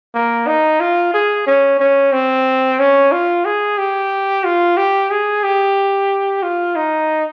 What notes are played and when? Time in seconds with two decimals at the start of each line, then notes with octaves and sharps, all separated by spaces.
0.14 A#3
0.47 D#4
0.80 F4
1.14 G#4
1.47 C#4
1.80 C#4
2.12 C4
2.79 C#4
3.12 F4
3.45 G#4
3.78 G4
4.44 F4
4.77 G4
5.10 G#4
5.43 G4
6.43 F4
6.76 D#4